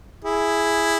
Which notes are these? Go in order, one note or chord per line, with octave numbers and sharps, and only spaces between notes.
E4 G#4